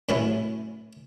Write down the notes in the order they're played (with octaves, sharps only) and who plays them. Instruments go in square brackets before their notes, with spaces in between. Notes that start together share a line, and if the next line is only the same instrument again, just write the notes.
[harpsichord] A2 C3 F#3 A3 C#4 E4